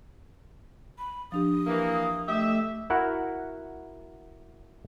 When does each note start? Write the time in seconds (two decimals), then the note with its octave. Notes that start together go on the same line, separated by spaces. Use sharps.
0.98 B5
1.32 F3 D4 G4 D#6
1.67 E3 A#3
2.28 A3 G4 D#5 E5
2.90 E4 F#4 A#4 F#5